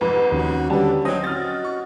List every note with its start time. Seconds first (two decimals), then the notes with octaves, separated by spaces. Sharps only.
0.01 C2 F2 G#2 B4
0.32 D#2 C#4 F#4
0.70 D3 G3 B4 A5
1.05 F#3 C4 D#5 G5
1.24 F#4 F6 A6
1.64 C#6